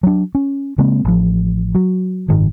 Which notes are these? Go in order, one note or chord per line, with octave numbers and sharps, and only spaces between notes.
F#3 D4
C#4
C#3 G#3 A#3 C4
A1 F3
F#3
F#1 G#2 D#3